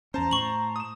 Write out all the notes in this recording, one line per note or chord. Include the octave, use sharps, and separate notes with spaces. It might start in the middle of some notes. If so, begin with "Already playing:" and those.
E2 C#4 C5 A5 A#5
A2 C#6 F#7
D#6 E7